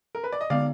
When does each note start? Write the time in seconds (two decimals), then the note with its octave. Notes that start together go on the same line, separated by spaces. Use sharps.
0.15 A#4
0.24 B4
0.32 D5
0.41 D#5
0.50 D3 G#3 B3 D#4 D5 F5